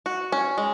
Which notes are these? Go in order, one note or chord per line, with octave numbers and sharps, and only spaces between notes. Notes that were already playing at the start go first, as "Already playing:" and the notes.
F#4
C#4
G#3